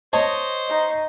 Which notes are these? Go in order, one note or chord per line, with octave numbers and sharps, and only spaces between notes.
C5 C#5 D#5 A5
D#4